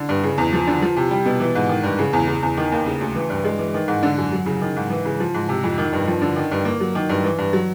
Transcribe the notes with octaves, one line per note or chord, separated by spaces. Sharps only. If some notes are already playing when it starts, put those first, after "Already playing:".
Already playing: D3
G2
C#3
E2
F3
D3
F3
C3
G3
B2
E3
G#2
D#3
G2
C#3
E2
C#3
E2
D#3
D#2
C#3
D2
E3
G2
G#3
E3
D#3
G#2
D3
F#2
F#3
C#3
D#3
G#2
E3
C#3
F3
G#2
C3
F2
D#3
G2
F3
D3
D#3
G2
A#3
F#3
D#3
G2
E3
G2
F#3